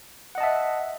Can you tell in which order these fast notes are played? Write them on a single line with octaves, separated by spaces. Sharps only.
F#5 D#5 A5 E5